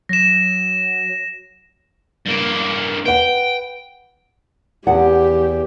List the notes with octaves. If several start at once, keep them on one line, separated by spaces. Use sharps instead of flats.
F#3 A#6 E7
G2 A#3
B4 F#5 G5
E2 G4 F#5